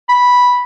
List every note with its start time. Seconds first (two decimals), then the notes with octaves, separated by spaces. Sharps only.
0.09 B5